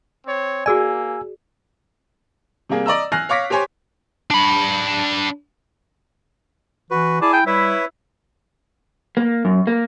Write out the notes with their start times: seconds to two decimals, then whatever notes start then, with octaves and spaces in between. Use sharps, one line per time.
0.24 C4 C#5
0.66 A#3 F#4 G#4 D5 G#5 E6
2.69 C3 G3 A#3 G#4
2.86 D5 D#5 A#5 E6
3.12 G#5 F6 F#6 A#6 C7
3.29 C#5 F5 D6 A#6 B6
3.50 G4 C5 C#5 G#5 C6
4.30 D4 B5
6.91 E3 F#4 B4
7.22 E4 G#4 D5 G#5 A5
7.33 G5
7.47 G3 E4 B4 C#5 E5
9.17 A#3
9.45 F#2
9.67 A#3